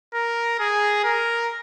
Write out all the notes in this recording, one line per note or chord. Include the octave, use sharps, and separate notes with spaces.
A#4
G#4
A#4